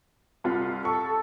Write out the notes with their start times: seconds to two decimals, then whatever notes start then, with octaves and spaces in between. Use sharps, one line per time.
0.44 C2 F4
0.85 A4 C#6